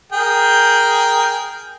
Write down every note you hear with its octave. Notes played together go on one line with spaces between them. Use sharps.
G#4 A#4 G5